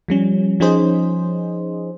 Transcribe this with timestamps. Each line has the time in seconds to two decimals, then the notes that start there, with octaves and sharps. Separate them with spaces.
0.08 F3 G3 C#4
0.60 F3 C#4 D#4 G#4 C5 D#5